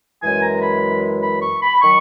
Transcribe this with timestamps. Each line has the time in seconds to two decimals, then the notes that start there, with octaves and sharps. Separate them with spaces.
0.22 F#2 E3 G#3 G#5
0.43 A#5
0.62 B5
1.22 B5
1.41 C#6
1.62 B5
1.81 D#3 F#3 C#6